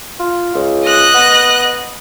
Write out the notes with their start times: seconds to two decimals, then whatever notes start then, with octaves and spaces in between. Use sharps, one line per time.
0.20 F4
0.55 C#2
0.84 D#5 F#6
1.14 B3